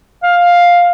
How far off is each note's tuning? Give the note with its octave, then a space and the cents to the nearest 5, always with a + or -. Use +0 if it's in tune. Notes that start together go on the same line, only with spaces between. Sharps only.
F5 +5